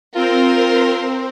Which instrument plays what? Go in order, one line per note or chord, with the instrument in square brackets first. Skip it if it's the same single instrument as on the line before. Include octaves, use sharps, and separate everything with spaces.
[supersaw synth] C4 [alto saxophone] F4 [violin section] A#4 C5